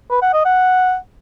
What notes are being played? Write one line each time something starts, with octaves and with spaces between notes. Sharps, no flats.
B4
F#5
D#5
F#5